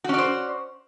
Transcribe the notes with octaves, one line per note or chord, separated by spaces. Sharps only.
C#4 F#4 C5 D5